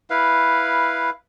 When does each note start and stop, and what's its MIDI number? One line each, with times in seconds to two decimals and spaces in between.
0.10 1.10 64
0.10 1.10 71
0.10 1.10 77